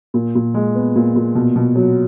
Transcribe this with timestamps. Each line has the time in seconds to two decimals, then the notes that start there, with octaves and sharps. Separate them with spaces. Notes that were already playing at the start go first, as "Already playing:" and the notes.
0.14 A#2
0.35 A#2
0.54 G#3
0.75 B3
0.96 A#2
1.16 A#2
1.35 B2
1.56 B2
1.76 F#3